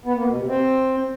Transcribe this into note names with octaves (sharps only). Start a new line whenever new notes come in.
B3
A#3
B2
C3
C4